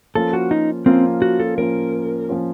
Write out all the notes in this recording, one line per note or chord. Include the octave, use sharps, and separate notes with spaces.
F3 A#3 C#4 F4 A4
F#4
D#4
F3 A#3 C4 C#4 F4
F#4
A4
F3 A#3 C#4 F4 A#4
F3 A#3 C#4 F4